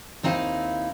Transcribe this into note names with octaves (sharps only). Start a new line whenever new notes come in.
D#2 C4 D#4 E4 F5